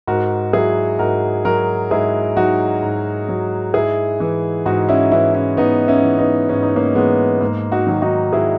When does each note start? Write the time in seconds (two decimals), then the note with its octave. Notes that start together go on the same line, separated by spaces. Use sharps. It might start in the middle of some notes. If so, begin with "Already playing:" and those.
0.07 G#2 F#4 A#4
0.53 F#3 E4 G#4
0.99 G#2 F#4 A#4
1.45 F#3 F#4 A#4
1.91 G#2 E4 G#4
2.36 F#3 D#4 F#4
2.83 G#2
3.28 F#3
3.74 G#2 E4 G#4
4.20 E3
4.66 G#2 D#4 F#4
4.89 C#4 E4
5.12 E3 C#4 E4
5.35 C#4 E4
5.57 G#2 B3 D#4
5.88 C#4 E4
6.03 E3
6.18 B3 D#4
6.49 G#2 C#4
6.63 D#4
6.76 A#3 C#4
6.95 E3 G#3 B3
7.41 G#2 A#3
7.72 D#4 F#4
7.87 D#3 F#3
8.02 D#4 F#4
8.32 G#2 E4 G#4